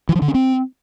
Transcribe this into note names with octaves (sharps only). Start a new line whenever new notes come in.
E3
F3
D3
C#4
C4